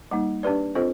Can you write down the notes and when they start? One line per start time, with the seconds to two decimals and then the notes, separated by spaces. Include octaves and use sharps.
0.11 G3 A#3 D#4
0.43 D4 G4 B4 D5
0.75 C4 F4 A4 C5 D#5